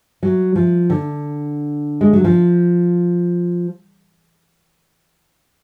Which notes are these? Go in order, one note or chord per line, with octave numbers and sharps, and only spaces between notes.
F#3
F3
D3
G#3
F#3
F3